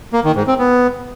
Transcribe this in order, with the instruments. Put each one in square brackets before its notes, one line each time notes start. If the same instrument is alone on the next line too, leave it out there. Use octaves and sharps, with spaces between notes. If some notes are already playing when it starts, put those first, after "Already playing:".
[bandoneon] A#3
D#3
G#2
C4
B3